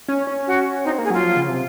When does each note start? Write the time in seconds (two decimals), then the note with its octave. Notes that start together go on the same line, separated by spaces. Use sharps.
0.08 C#4
0.27 C#4
0.47 F#4
0.85 C4 D#4
0.98 A#3
1.04 G#4
1.10 F#3 F4
1.24 F3
1.36 C#3
1.49 C3